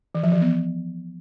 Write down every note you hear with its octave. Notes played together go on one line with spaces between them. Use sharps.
E3
F3
E3
B3